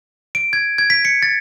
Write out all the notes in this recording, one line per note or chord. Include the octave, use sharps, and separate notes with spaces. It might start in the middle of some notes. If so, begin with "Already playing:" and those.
D7
G#6
G#6
B6
C#7
A6